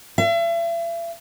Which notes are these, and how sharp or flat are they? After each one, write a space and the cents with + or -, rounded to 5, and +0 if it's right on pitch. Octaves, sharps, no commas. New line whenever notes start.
E5 +40